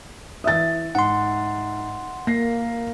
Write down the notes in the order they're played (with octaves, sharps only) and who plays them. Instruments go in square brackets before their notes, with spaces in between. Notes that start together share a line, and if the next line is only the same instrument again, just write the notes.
[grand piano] E3 D#6 [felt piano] E5 A6
[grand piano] G#2 [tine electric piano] F#5 C6
[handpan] A#3 [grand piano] A#6 C7